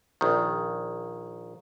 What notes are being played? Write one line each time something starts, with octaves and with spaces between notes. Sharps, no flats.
A#1 D#3